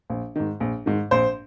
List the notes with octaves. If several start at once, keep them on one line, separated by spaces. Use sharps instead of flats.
A#1
G#2 D#3
A#1
G#2 D#3
A#1 C5